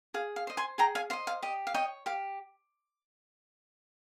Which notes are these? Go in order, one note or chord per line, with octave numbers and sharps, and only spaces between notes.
G#4 F5
F5
C5 D#5
G#5 C6
G#4 G5 A#5
F5 G#5
C5 D#5 F5
F5
G4 D#5
F5
C#5 D#5 G5
G4 F5